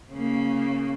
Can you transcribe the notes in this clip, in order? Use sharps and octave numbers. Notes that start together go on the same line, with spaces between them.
C#3 A#3